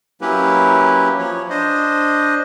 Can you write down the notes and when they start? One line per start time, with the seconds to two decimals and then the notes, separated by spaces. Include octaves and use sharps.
0.21 F#3 A#3 C#4 E4 G4 B4
1.18 F3 C#5
1.50 D4 C5 D#5